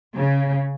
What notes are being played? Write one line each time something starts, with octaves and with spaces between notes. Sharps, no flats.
C#3